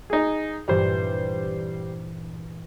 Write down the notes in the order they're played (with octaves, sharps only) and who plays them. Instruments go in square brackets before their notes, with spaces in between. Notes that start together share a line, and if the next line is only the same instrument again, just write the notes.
[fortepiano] D#4 G#4
[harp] G2 A#2 E3 [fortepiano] G3 C5